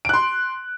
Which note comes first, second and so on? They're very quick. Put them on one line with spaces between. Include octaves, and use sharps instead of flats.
D7 F#6 C6